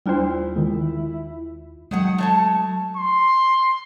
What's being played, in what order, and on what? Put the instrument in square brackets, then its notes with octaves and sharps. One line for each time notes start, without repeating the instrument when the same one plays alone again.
[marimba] D#2 F4 G5 [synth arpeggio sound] G3 D4 C5 [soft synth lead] E4
[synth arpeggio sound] D#3 G#3
[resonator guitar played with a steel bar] D#3 C#5 F#5 [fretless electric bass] F#3 G#3
[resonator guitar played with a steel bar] A3 C#5 A5
[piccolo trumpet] C6